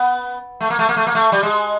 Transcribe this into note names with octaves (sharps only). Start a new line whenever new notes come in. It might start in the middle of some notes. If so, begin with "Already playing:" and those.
Already playing: B3
A3
A#3
A3
A#3
A3
A#3
A3
G3
G#3